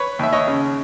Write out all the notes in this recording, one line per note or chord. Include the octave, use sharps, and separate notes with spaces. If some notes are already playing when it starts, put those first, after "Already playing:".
Already playing: B4 C#5
D#2 E5
C#5 D#5
C#3